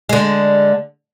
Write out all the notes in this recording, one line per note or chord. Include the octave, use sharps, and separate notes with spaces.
D3 G#3